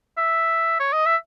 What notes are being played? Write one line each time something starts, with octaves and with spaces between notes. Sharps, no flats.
E5
C#5
D#5
E5